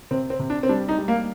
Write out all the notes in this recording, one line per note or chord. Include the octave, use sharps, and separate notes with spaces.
C3 C4
C4
C3
D4
C4
G3 D4
D#4
G3
A#3